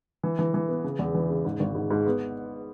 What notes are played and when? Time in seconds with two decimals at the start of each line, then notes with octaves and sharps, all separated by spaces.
0.24 E3
0.39 E3
0.54 E3
0.68 B3
0.84 C#3
0.99 E2
1.15 E3
1.30 C#3
1.45 G#2
1.60 G#1
1.75 G#2
1.91 G#2
2.06 B3